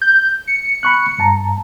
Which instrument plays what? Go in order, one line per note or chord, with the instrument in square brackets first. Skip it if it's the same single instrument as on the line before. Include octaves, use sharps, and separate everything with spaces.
[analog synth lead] G6
C#7
[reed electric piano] B5 C#6 F#6
G2 A5 A#5